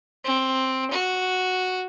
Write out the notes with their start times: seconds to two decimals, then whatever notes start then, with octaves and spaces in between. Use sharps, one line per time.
0.24 C4
0.91 F#4